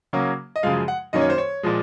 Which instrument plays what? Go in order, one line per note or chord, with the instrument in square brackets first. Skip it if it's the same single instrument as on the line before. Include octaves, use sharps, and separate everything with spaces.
[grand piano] C#3 F#3 A#3 C#4
D#5
F#2 C#3 F3 G#3 F5
F#5
F#2 D#3 A#3 C#4 D#5
C#5
C5
C#5
A#2 F3 G#3